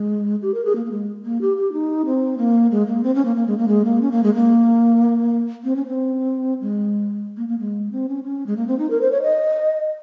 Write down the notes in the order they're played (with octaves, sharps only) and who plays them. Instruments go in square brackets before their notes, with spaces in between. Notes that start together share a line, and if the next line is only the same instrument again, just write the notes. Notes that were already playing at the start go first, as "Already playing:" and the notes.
Already playing: [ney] G#3
G4
A#4
G#4
A#3
A#3
G#3
A#3
G4
G4
D#4
C4
A#3
G#3
A#3
C4
C#4
A#3
A#3
G#3
A#3
G#3
A#3
C#4
A#3
G#3
A#3
C4
C#4
C4
G#3
A#3
A#3
G#3
C4
C#4
C#4
G#3
A#3
C4
D#4
A#4
C5
C#5
D#5